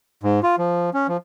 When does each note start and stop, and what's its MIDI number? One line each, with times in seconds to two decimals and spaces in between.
0.23 0.40 44
0.43 0.56 65
0.58 0.90 53
0.94 1.07 61
1.08 1.17 53